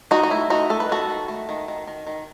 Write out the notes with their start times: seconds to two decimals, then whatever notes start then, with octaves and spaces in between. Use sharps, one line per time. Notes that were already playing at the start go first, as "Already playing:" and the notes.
0.11 D#3 D#4 F#4
0.23 F#4
0.30 A3 E4
0.50 A3 D#4 F#4
0.70 A3 A4
0.80 B4
0.89 D#3 F#4 A4
1.09 D#3
1.28 A3
1.49 D#3
1.68 D#3
1.87 D#3
2.07 D#3